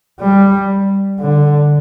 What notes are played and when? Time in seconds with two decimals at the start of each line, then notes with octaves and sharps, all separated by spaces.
0.20 G3
1.20 D3